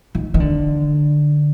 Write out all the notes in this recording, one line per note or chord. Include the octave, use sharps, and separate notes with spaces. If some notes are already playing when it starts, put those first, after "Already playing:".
D#3
D#3
D3